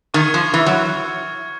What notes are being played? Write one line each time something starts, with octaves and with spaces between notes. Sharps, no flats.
D#3 C#6 F6 G#6 C#7
F3
E3
F#3